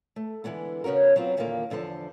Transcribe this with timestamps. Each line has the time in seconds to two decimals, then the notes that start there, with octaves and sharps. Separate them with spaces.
0.16 A3
0.44 D3 E3 G#3 A3 B3
0.84 C#3 B3 C#4 F#4 A#4
1.16 F#3 B3 C4 F4
1.37 E2 A#2 D3 D#3 G#3 A#3
1.70 E2 D3 F3 C5 A5